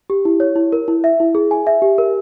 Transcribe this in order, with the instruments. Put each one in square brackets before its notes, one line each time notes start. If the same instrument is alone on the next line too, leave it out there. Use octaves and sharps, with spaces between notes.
[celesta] G4
E4
C#5
E4
A#4
E4
E5
E4
G#4
G#5
E5
G4
A#4